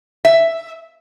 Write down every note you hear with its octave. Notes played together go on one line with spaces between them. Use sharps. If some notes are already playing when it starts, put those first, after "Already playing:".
E5